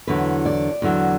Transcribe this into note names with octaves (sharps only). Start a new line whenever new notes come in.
E2 D3 F#3 B4
D5
E2 D3 F#3